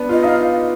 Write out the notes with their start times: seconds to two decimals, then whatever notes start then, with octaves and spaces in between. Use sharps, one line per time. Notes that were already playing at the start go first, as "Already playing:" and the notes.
Already playing: B3 D4
0.09 F4
0.12 D#5
0.23 D#4 F5